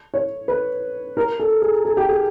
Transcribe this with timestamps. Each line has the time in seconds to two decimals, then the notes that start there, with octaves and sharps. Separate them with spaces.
0.14 C#5
0.48 B4
1.17 A#4
1.40 A4
1.62 G#4
1.85 G#4
1.97 G4
2.09 G#4